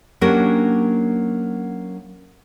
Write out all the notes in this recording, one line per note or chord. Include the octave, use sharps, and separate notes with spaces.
F#3 A#3 C#4 D4 G4 A#4